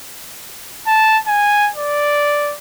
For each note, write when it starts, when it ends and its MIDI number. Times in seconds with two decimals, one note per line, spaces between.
0.87 1.18 81
1.27 1.70 80
1.76 2.54 74